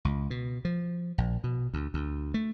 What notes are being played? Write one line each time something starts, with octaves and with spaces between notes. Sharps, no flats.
C#2
B2
F3
A#1
B2
D2
D2
A3